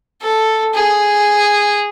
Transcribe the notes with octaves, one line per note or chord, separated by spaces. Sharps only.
A4
G#4